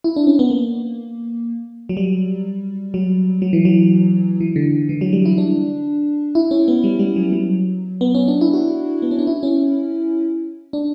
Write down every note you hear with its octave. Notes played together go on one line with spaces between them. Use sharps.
E4
D4
C#4
B3
A#3
F#3
G3
F#3
F#3
E3
F#3
E3
D3
E3
F#3
G3
E4
D4
E4
C#4
B3
G3
G3
F#3
F#3
B3
C#4
D4
E4
F#4
B3
C#4
D4
E4
C#4
D4